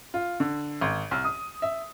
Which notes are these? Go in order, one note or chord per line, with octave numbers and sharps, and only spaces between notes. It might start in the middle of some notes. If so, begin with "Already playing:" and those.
F4
D3
G#1
C2
D#6
E5